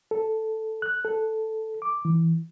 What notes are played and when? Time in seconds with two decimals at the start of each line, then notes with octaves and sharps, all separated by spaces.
0.11 A4
0.82 F#6
1.05 A4
1.82 D6
2.05 E3